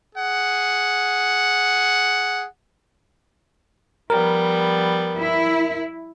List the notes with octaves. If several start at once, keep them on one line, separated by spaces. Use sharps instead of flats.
G#4 F#5
F3 G3 B3 A#4
E4